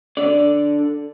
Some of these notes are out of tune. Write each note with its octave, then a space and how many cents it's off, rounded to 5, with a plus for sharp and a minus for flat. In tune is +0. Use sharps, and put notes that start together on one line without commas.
D3 +0 D5 +0